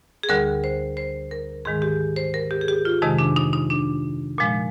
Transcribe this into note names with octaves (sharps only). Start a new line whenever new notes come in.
G#4
D2 D3 G3 A#4
C5
C5
A#4
G#2 D#3 G#3 G#4
G4
C5
A#4
G4
G#4
G4
F4
F2 C3 D#3 G#3 D#4
D4
D#4
D#4
D4
A#2 F3 G#3